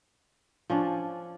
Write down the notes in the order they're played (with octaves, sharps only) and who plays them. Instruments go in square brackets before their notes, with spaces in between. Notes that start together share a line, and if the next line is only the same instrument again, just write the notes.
[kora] F3 C#4 D4